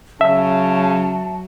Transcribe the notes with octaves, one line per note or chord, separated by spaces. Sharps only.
C#3 F#3 E5 A5